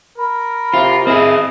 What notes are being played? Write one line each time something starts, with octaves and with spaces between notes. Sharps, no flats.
A#4 B5
C3 F4
C4 E4 G#4 D#5